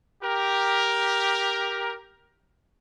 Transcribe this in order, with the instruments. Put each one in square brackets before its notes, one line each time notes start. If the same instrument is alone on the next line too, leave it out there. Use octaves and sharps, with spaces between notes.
[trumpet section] G4 A#4